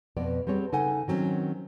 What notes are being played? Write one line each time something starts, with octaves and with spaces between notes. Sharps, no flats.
F2 B2 B3 D5
G3 B3 C4 G#4 C#5
C#3 D#4 A4 F#5 G#5
D#3 F#3 C4 C#4